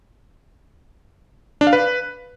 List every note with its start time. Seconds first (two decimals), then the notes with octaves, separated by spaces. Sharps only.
1.61 D4
1.67 F5
1.73 B4